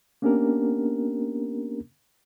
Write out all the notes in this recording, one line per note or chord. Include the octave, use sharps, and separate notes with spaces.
A#3 B3 C#4 D4 G4 A#4